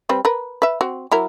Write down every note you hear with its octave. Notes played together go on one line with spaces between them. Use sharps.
G3 C4 B4
A#4 B4
B4 E5
C4 F#4
F#3 E4 A#4